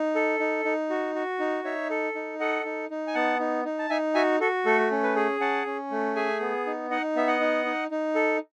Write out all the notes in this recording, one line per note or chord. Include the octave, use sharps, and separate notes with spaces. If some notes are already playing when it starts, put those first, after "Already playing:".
Already playing: D#4
A4
D#4
D#4
F#4
F#4
D#4
D#4 C#5 E5
A4
D#4
A4 D#5 F#5
D#4
D#4
G#5
B3 F#5 A5
D#4
D#4
A5
D#4 E5 G#5
F#4 E5 G#5
F#4 A4
A3 A4
C#4
B4
G#4
C#4 F#5 A5
C#4
A3
G#4 E5 G#5
B3
D#4
D#4 D#5 F#5
B3 E5
D#5 F#5
D#4
D#4
D#4
A4